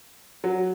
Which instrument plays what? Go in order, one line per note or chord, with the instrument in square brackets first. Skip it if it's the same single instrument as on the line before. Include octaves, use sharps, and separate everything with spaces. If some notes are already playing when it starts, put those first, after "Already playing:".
[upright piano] F#3